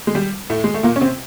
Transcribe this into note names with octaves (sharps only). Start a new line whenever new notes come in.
G#3
G3
A2 A3
G#3
A3
A#2 A#3
C#4
C3 C4